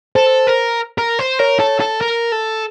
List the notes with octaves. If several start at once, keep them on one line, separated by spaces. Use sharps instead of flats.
A4 C5
A#4
A#4
C5
A#4 C#5
A4
A4
A#4
A4